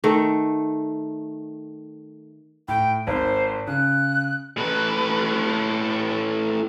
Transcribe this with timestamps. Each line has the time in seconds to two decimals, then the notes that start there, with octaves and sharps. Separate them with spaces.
0.04 D#3 A3
2.68 A2 G5
3.07 G#1 C5
3.67 C#3 F#6
4.58 A2 B4